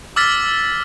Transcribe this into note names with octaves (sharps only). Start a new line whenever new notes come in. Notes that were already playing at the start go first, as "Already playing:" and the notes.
D6 E6 F6 A6 B6